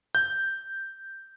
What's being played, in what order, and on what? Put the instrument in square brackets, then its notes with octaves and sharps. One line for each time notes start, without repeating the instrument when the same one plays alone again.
[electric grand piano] G6